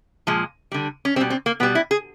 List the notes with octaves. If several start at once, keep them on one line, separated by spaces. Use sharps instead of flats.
A#2 F3 G#3
D3 G3
C#4
B2 G3 C4
C4
A#3
B2 G3 B3
E4
G#4